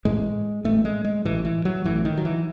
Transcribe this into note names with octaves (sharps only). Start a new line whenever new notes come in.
A1 A2 G#3
A1 A2 A3
G#3
G#3
A1 A2 E3
E3
F#3
A1 A2 E3
D#3
F#3
E3